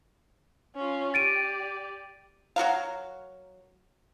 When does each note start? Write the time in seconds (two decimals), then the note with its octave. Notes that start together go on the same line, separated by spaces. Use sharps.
0.76 C#4 F4
1.14 G4 D5 A6 D7 D#7
2.56 F#3 F#4 A#4 F5